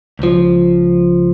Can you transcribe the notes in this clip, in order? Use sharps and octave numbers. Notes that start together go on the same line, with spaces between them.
C#2 F3